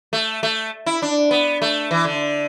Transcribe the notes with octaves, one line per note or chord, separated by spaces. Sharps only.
A3
A3
E4
D4
B3
A3
E3
D3